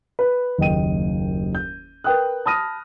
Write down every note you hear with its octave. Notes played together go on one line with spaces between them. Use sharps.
B4
F#1 D#2 D#5 G5 D#7
G6
A#4 B4 G5 D#6 F#6
A5 B5 D#6 F6 A#6 D#7